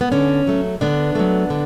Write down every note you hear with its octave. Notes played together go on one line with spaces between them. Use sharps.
B3
D3 C#4
F#3 A3
D3 B3 D4
F#3 A3
D3